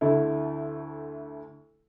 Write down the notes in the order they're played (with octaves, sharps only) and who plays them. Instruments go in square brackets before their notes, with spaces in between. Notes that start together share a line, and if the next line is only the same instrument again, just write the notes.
[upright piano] D2 D3 A3 E4